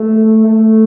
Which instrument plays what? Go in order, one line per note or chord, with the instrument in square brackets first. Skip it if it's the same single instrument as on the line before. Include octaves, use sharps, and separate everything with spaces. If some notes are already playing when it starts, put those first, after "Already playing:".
Already playing: [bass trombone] A3
A3